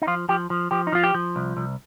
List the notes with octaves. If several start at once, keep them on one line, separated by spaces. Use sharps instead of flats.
D#4
F3 F4
F3 G4
F3
F3 G4
D#4
F3 F4
G4
F3
C2
C2